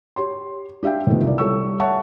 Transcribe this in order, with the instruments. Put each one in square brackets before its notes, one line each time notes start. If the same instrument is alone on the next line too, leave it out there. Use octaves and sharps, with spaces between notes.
[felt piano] G4 C#5 C6
D4 G4 E5 F5 G5
C3 D#3 F3 A3 B3
C2 D5
G3 A4 C#5 C#6 E6
C#5 E5 F#5 A5 C#6